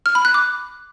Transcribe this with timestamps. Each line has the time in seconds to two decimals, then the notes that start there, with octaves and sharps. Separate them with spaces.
0.06 F6
0.15 B5
0.25 F#6
0.34 D6